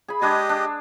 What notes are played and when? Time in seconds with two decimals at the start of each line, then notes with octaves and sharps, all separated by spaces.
0.08 G#4 B5
0.22 G#3 D4 G4 G#4 D#5
0.49 D4